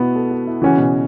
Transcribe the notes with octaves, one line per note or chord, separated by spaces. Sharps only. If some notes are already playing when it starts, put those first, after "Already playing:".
Already playing: B2 B3 E4 F#4
A4
F#4
E4
C#3 E3 C#4 F#4
B2